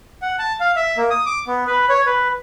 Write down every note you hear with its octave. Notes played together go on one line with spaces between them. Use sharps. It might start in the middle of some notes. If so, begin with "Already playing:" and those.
F#5
A5
F5
E5
A#3
D#6
D6
B3
B4
C#5
B4